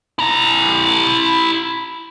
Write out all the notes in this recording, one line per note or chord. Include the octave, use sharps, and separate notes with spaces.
E4 A#5